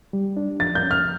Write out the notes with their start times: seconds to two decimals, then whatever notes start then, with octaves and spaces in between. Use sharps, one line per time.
0.13 G3
0.37 D4
0.60 F3 A6
0.75 G6
0.83 C#4
0.91 F6